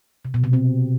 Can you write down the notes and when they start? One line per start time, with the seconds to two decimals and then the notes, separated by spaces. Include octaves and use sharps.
0.25 C3
0.34 B2
0.44 C3
0.53 C4